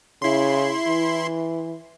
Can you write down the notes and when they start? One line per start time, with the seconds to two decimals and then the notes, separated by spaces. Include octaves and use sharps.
0.22 C#3 E4 C6
0.88 E3